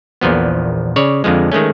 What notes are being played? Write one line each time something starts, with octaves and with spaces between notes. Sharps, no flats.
A#1 E2 A#2 F3 B3
C#3 C#5 D5
F2 D3 F3 G#3
D#3 G#3 A3 C#4